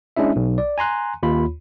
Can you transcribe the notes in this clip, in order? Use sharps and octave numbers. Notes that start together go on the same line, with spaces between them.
G#3 C#4 D4 E4 E5
B1
D5
G#5 A#5 C6 F#6
D#2 F4 B5